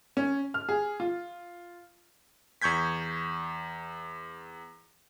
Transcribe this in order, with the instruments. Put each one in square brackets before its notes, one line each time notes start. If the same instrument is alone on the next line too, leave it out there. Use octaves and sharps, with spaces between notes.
[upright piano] C#4
F6
G#4
F4
[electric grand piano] E2 C#6 G6 G#6 B6